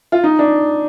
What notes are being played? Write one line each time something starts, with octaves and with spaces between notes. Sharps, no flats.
F4
D#4
D4